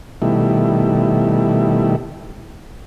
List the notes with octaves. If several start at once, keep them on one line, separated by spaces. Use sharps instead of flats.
B2 D#3 G3 A3 E4